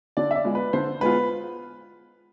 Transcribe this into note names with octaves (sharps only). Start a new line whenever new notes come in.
D3 D5
E5
D5
G#3 B3 F4
B4
D3 C5
G#3 B3 F4 B4